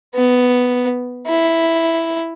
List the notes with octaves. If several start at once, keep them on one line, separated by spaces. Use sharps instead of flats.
B3
E4